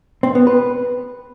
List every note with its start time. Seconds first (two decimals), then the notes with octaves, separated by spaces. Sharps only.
0.23 C4
0.35 B3
0.47 B4